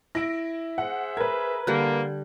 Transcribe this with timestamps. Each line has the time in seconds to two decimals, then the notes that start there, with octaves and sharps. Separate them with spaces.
0.15 E4 E5 A#6 D7
0.78 G#4 C5 E5 F#5
1.17 A#4 B4 G#6
1.67 D3 G3 A#3 F#6 G6